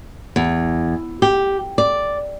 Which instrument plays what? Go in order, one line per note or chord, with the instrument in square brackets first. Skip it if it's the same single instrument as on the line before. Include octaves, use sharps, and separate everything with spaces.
[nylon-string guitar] E2
G4
D5